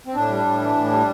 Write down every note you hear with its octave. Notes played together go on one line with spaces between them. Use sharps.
C4
A2 D4
G3
A2
E3
A2
G3